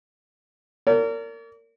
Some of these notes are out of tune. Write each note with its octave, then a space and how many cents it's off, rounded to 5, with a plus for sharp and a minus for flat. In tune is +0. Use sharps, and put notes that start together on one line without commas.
A#4 -30 D5 -45